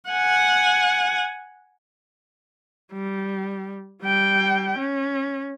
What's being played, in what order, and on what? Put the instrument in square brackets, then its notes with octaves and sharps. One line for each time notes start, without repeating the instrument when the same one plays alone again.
[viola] F#5 G#5
[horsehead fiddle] G3
G3 G5
C#4